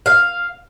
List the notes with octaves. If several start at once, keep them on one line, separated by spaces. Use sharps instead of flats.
F5